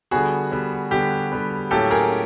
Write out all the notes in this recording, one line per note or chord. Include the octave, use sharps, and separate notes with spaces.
D3 G3 B3 F#4 G#4
D3 G3 B3
D3 G3 B3 G4
D3 G3 B3
A2 F#3 A#3 C#4 G4 A4
G#4 A#4
C#4